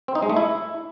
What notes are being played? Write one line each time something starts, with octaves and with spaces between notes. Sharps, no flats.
C4
D#4
G#3
A3
E4